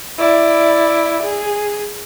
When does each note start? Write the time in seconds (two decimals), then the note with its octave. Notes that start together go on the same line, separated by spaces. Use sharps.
0.18 E4 D5
1.23 G#4